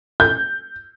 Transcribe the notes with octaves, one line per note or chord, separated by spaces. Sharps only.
G6